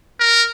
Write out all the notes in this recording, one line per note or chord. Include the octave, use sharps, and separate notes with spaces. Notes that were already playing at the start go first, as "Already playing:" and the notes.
A#4